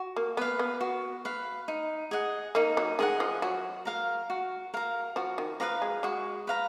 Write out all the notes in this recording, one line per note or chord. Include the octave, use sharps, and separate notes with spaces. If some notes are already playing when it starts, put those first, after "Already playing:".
Already playing: F#4
A#3
B3 B4 F5
B3
F#4
B4 F5
D#4
G#4 D#5 F#5
A#3 D#4
F#3
D#3 G#4 D#5 F#5
F3
F#3 F#4
A#4 F5 A#5
F#4
A#4 F5 A#5
F3 F#4
D#3
F3 B4 F5 A#5
G#3
G#3 F#4
B4 F5 A#5